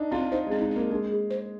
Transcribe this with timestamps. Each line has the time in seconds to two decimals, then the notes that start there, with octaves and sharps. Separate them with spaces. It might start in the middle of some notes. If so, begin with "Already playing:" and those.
Already playing: D4 D#4
0.12 C4 F4
0.32 D#4 C5
0.47 G#3 C4
0.61 D#4
0.70 C4
0.76 A#3
0.90 G#3 D4
1.10 G#4
1.30 C5